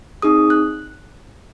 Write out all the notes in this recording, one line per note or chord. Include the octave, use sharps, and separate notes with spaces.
C4 D#4 G#4 D#6
F#6